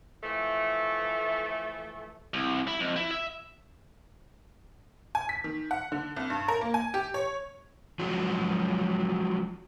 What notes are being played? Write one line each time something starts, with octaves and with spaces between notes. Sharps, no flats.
E3 F3 A3
C2
E4
F2
E4
E5
G#5
B6
D#3
F#5
D3
C2
G2
A#4
A#3
G#5
G4
C#5
F3 F#3 G#3 C#4 F#4